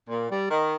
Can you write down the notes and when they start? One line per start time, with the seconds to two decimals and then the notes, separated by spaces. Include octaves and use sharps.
0.09 A#2
0.29 G3
0.50 D#3